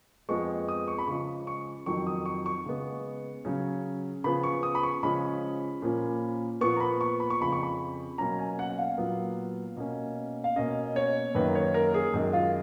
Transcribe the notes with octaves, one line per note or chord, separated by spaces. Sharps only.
F2 F3 G#3 B3 C#6
D#6
C#6
B5
C#3 F3 G#3 C#6
C#6
F2 D#3 F#3 C#6
D#6
C#6
C#6
C#3 G#3 B3
C#3 F#3 C#4
C#3 F3 B3 B5
C#6
D#6
B5
C#6
C#3 F3 G#3 C#4 B5
A#2 F3 A#3 C#4
A#2 F3 B3 C#6
A#5
B5
C#6
B5
C#6
F2 C#3 F3 B5
C#6
B5
B2 F#3 A#3 C#4 A#5
G#5
F#5
F#5
F5
A#2 F#3 B3
B2 A#3 C#4
F5
B2 A#3 C#4 D#5
C#5
F#2 D#3 A#3 B4
C#5
A#4
G#4
F#2 D#3 G#3
F4